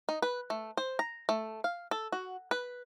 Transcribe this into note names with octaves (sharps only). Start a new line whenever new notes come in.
D#4
B4
A3
C5
A#5
A3
F5
A4
F#4
B4